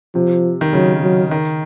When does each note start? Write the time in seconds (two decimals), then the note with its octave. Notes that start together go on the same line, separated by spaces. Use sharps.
0.15 C3 F3
0.61 D#3
0.73 C#3 F#3
1.03 F#3
1.31 D#3